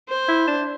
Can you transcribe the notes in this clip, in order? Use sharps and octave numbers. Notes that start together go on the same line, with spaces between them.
C5
E4
D4